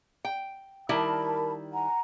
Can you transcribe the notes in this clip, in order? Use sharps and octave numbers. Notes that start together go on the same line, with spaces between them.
G5
D#3 G3 E4 A#4 A5 B5
F#5 G#5 A#5